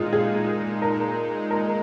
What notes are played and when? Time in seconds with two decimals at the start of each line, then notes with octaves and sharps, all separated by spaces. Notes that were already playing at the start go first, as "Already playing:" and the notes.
Already playing: A#2 G#3 D#4 F4 G#4
0.13 G#4
0.82 A#4
1.51 A#4